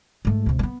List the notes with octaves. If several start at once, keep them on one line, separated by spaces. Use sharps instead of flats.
G#2 A3
C#2 C3
A3 B3